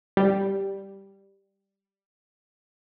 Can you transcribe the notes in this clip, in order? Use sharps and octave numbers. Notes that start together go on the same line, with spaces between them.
G3